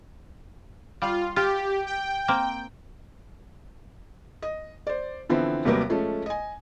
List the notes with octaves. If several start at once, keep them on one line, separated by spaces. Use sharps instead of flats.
G3 F4
F4 G4
G5
A#3 C4
D#5
C5 D5
D3 E3 F3 B3 C4 E4
D#2 C3 F#3 G3 A#3 B3
F3 G#3 A3 C#4
D#5 G#5